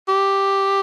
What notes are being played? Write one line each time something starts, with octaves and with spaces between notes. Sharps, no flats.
G4